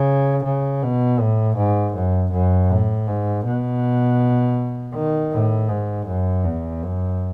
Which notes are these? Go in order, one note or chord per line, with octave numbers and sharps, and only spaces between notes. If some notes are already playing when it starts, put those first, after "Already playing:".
Already playing: C#3
C#3
B2
A2
G#2
F#2
F#2
A2
G#2
B2
D#3
A2
G#2
F#2
E2
F#2